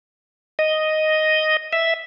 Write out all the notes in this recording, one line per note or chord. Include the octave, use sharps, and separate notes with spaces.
D#5
E5